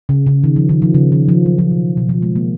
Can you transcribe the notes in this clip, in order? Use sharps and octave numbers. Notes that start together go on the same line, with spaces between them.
C#3
C#3
D#3
F3
D#3
F3
C#3
D#3
F3
F#3
F3
B2
B2
F3
G#3
A#3